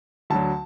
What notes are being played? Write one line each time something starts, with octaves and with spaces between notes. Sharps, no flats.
D2 D3 F#3 A5